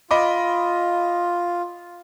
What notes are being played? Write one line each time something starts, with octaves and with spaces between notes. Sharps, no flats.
F4 D#5 B5 D6